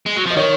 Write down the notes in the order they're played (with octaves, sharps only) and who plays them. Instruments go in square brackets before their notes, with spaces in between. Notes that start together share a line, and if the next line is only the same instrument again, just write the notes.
[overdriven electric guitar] G#3
F#3
[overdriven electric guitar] F3 [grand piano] D#5
[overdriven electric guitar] D#3 [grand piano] C#5